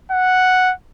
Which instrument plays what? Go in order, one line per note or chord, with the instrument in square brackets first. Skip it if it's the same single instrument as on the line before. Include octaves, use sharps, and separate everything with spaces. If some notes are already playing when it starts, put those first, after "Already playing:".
[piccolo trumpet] F#5